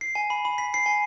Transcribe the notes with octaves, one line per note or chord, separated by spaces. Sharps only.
C7
G#5
B5
B5
B6
C7
G#5